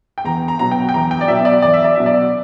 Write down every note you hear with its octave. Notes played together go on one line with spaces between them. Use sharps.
G5
E2 A#5
A#5
B2 F#3 A#5
G5
G5
E2 A#5
G5
D5
B2 F#3 E5
D5
E2 D5
E5
D5
B2 F#3 E5
D5